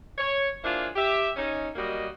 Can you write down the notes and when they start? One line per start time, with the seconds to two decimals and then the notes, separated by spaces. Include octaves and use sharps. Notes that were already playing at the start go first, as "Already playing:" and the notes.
0.18 C#5
0.63 A#3 D4 E4 F4 G#4 C5
0.96 G4 E5
1.36 C#4 D#4
1.76 F#3 G3 A#3 F#4 D#5